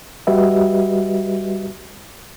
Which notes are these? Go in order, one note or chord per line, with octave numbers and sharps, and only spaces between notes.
G3 F#4 G4 B4 D#5 E5